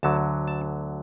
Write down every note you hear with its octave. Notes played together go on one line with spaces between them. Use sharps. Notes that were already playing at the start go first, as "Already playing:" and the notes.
D2 D3 F#3 A5
A5